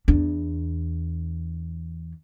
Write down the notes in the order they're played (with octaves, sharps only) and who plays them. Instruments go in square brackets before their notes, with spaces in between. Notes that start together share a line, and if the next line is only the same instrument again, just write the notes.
[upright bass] E2 D4